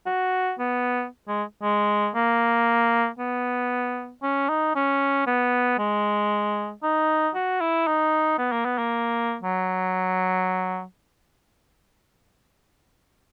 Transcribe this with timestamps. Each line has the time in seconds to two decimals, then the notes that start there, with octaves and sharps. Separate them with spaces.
0.06 F#4
0.59 B3
1.28 G#3
1.62 G#3
2.15 A#3
3.19 B3
4.23 C#4
4.49 D#4
4.75 C#4
5.27 B3
5.78 G#3
6.83 D#4
7.35 F#4
7.61 E4
7.87 D#4
8.38 B3
8.52 A#3
8.65 B3
8.78 A#3
9.43 F#3